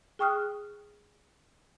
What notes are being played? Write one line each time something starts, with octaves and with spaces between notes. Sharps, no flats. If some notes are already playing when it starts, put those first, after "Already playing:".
G#4 G5 C#6 D#6 F6 F#6